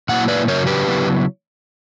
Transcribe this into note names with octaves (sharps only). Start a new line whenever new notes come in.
A#2 F#3 A#3 E4 F#5
B4 D5
F#2 C#3 F#3 A#4 C#5
G4 B4
C#3 F#3 B3 E4